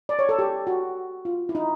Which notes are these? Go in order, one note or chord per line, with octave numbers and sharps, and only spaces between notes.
D5
C#5
A4
G4
F#4
F4
E4
D#4